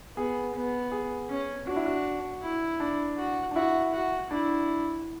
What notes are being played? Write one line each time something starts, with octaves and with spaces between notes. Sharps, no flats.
B3 G#4
B3
G#4
C#4
D4 F#4
E4
F#4
E4
D4
F#4
D4
E4 F#4
F#4
D4 E4